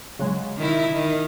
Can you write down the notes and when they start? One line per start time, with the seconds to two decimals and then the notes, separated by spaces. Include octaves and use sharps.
0.19 C#3 F#3 G#3
0.57 D#3 E4
0.94 D#3